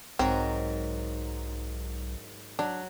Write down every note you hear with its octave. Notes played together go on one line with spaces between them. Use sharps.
B1 G#2 F#3 C4 A#4
F#3 D4